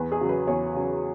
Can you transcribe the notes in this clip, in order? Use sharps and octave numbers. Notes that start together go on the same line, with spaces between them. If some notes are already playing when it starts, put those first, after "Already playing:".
Already playing: E2 B4
G#4
C#3 F#3
B4
E2 C#5
C#3 F#3